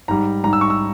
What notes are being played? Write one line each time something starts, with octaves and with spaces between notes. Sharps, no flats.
G#2 G3 A#5
G#2 G3 A#5
E6
C#6
E6